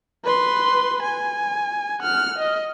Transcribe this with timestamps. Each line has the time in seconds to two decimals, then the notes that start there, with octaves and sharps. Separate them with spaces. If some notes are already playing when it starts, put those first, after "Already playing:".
0.24 B4 C6
1.02 G#5
2.00 F#5 F6
2.38 D#5